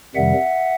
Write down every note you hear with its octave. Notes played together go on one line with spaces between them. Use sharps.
F2 C3 D#3 G3 E5 F#5